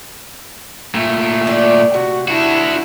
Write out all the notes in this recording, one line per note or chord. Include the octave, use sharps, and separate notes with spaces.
A#2 A3
D5
C3 F#4
D4 E4 F#4